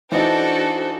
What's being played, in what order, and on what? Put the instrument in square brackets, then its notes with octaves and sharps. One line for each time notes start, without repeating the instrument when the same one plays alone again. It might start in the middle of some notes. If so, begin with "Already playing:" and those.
[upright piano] E3 D#4 [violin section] D4 A4 [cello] F#4 [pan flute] C5